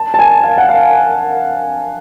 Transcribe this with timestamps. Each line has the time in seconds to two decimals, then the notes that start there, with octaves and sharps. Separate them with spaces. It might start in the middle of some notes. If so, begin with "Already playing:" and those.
Already playing: A5
0.14 A5
0.19 G#5
0.44 F5
0.58 F#5
0.69 F5